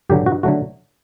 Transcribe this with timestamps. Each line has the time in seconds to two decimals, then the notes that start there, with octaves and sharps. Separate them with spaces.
0.09 G2 D3 F#3 G4
0.26 G2 F#4
0.43 D3 F#3 A3 F#4